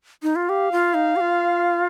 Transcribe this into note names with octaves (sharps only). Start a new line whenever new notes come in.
D#4
F4
G4 F5
F4
D#4
G4
F4